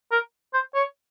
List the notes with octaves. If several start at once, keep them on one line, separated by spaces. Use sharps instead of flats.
A#4
C5
C#5